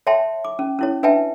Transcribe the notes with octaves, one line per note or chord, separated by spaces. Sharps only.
C#5 E5 G5 A5 C6
D6
C#4
C#4 E4 C#5
D4 B4 D#5 E5 G5 A5